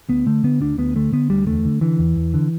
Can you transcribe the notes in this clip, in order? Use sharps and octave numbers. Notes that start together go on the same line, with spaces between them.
D2 B3
D3 A3
D3 B3
D2 D4
D2 B3
D3 A3
D3 B3
D2 G3
E2 A3
D3
D3 E3
E2
E2
D3